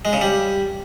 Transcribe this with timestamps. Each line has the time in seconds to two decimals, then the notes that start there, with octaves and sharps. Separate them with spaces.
0.05 G#3
0.13 C#3
0.21 G3